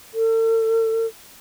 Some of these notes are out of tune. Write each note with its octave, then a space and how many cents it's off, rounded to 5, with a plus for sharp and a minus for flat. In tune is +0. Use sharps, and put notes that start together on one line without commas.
A4 +40